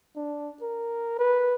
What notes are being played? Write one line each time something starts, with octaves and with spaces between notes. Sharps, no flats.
D4
A#4
B4